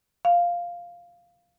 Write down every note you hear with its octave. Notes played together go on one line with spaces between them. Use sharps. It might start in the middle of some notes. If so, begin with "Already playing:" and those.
F5